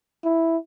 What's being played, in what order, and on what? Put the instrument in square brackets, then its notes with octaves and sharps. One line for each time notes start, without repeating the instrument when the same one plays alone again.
[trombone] E4